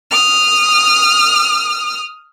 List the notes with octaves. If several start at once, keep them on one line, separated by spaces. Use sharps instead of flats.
D#6 F6